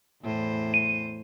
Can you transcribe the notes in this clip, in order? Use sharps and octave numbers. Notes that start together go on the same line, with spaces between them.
E2 A2 C5
D#7